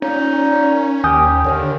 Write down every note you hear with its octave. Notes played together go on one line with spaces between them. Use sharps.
A#2 C#4 D#4
D#2 G4 A#4 G#5 D#6 G6
D#2 D3 D#3